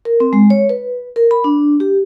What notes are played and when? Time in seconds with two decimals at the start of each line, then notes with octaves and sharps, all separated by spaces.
0.05 A#4
0.20 C4
0.33 G#3
0.50 C#5
0.69 B4
1.16 A#4
1.31 B5
1.44 D4
1.80 G4